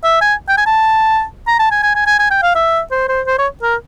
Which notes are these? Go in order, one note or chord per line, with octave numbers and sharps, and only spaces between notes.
E5
G#5
G5
G#5
A5
A#5
A5
G#5
G#5
G#5
G#5
G#5
G5
F5
E5
C5
C5
C5
C#5
A#4